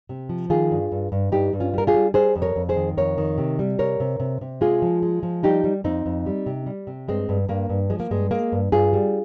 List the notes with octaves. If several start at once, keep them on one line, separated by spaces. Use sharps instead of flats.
C3
F3
D#3 F4 G#4
G2
G2
G2
G2 D#4 G4
G2
C#4 F4
G3 A#4
F4 G#4
G3
G3 G#4 C5
F2
A#4 C#5
F2
G#4 C5
D#3
F2 A#4 C#5
D#3
C3
G3
C3 A#4 C#5
C3
C3
C3
G#3 F4 G#4
F3
G#3
F3
G3 D#4 G4
G3
F2 C4 D#4
F2
G3
C3
G3
C3
G2 G#3 C4
G2
G2 A#3
G2
F3 G#3
A#3
G2 G#3
G#3 A#3
G2
G2 F4 G#4
G3